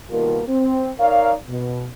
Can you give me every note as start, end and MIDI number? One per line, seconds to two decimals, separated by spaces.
0.10 0.41 47
0.10 0.41 51
0.10 0.41 55
0.10 0.41 58
0.10 0.41 65
0.10 0.41 70
0.48 0.90 60
0.99 1.33 63
0.99 1.33 70
0.99 1.33 73
0.99 1.33 74
0.99 1.33 77
1.49 1.86 47